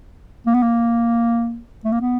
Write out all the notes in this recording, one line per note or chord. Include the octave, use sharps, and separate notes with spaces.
A#3
B3
A#3
A3
A#3
B3